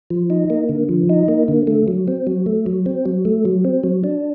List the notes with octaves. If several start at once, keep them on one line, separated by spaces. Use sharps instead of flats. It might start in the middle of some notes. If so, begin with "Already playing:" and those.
F3
D#4
A#3
D3
F3
D#4
A#3
D3
A3
F#3
C4
F#3
A3
F#3
C4
F#3
A3
F#3
C4
F#3
D4